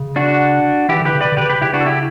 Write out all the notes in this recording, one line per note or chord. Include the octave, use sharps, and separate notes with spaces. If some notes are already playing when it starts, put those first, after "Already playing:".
Already playing: C#3
D4 F#4
E3 E4 G4
D3
G4 B4
C#3
D3 B4 D5
D3
C#3 G4 B4
G4 B4
C#3 E4 G4
D4 F#4
A4
E4 G4